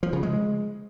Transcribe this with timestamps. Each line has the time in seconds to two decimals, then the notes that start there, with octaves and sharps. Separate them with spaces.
0.03 F3
0.13 C#3
0.23 G#3